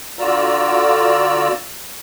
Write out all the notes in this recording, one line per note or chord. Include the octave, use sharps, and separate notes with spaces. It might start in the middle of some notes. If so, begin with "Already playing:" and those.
D3 F4 F#4 D5 A#5 E6